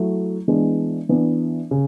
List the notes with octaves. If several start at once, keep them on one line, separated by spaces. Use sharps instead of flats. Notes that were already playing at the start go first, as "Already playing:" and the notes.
Already playing: F#3 A3 E4
E3 G#3 B3 D4
E3 B3 D4
C#3